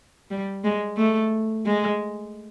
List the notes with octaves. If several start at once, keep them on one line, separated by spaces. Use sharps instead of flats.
G3
G#3
A3
G#3